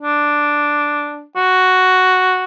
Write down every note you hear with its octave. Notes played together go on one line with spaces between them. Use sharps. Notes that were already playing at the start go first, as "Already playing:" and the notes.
D4
F#4